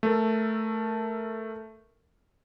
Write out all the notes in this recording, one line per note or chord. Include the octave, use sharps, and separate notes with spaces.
A3 A4 A#4